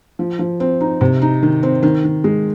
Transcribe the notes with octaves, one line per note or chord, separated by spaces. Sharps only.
F3
F3
C4
D#4
C3
D#4
D#3
C4
D#3
D#3
G#3